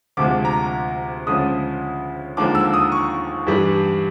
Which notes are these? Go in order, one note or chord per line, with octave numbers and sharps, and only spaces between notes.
D2 C3 F3 G#3 D6
A#5
D2 C#3 F3 G#3 D#6
D#2 D3 F3 G#3 D6
E6
D#6
C#6
G2 E3 G3